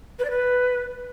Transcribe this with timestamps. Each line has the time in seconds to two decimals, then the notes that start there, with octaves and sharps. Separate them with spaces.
0.19 B4
0.25 D5
0.30 B4